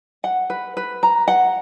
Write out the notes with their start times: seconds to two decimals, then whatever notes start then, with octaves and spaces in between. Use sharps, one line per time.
0.24 F#5
0.50 B4
0.77 B4
1.03 A#5
1.28 F#5